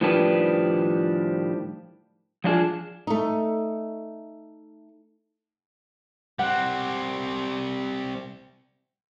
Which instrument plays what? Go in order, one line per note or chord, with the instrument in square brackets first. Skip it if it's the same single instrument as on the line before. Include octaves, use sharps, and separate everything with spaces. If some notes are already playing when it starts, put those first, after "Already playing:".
[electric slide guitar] A2 D#3 F3 G3 D4 B4
F3 F#3 D4 F4 G#4
[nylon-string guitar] A3 D#4
[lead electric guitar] G3 C4 [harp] F#5